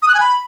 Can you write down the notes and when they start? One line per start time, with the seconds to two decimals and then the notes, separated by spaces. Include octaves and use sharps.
0.02 D#6
0.08 F#6
0.14 G#5
0.20 B5